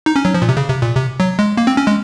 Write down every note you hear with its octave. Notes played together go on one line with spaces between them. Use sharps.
D#4
C#4
F#3
F3
A#2
C3
C#3
C3
A#2
C3
F#3
G#3
A#3
C4
C#4
G#3